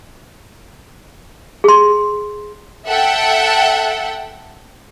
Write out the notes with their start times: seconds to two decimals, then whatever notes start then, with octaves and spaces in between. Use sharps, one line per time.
1.64 G#4 C6
2.86 A4 E5 F#5 G5